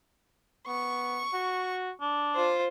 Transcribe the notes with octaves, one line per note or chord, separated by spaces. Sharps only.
B3 C#6
F#4
D4
F4 C5